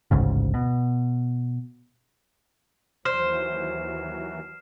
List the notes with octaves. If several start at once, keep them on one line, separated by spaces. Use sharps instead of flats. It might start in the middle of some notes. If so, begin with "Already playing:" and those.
A1 D2 G#2 C#3
B2
D#2 E3 F#3 C5 F6 C7 E7